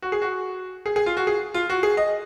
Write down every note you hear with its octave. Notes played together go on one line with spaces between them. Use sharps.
F#4
G#4
F#4
G#4
G#4
F4
F#4
G#4
F4
F#4
G#4
D#5